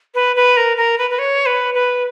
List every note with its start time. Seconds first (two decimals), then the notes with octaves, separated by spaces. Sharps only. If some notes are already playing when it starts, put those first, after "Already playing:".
0.15 B4
0.36 B4
0.57 A#4
0.77 A#4
0.98 B4
1.10 B4
1.19 C#5
1.46 B4
1.74 B4